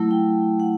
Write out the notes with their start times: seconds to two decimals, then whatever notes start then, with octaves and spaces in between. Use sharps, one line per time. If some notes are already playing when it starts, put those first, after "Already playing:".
Already playing: F#3 A3 E4
0.11 G5
0.60 F#5